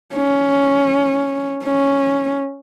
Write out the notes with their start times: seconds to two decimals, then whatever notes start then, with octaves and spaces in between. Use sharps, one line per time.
0.14 C#4
1.64 C#4